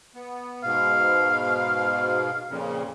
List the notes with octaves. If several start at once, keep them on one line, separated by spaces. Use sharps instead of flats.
B3
G#2 B2 F5
F2 A#2 C#3